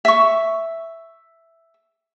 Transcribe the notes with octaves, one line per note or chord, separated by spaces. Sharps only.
E5 C#6